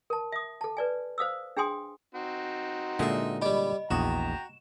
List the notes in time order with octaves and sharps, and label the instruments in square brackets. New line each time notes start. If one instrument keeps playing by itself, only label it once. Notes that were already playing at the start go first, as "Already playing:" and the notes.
[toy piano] A#4 A5
E5 D#6
A4 A5
B4 D5 G#5
C5 F5 D#6 E6
D4 G#4 G5 G#5 C6 D#6
[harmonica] C4 D#4 F#4
[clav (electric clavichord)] A#2 D3 G#3 [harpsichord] D#5 E5
[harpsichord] G3 G4 [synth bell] D#5 B5
[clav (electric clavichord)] A#1 E2 D#5 [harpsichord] F#4 [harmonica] G5 A#5 [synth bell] E7